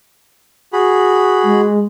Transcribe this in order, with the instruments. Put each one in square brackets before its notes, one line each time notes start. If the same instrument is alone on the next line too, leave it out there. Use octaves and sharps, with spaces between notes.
[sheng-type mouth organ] F#4 G#4 B5
[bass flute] G#3